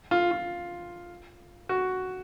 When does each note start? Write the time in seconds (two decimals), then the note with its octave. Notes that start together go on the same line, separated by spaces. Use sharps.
0.11 F4
0.31 F4
1.69 F#4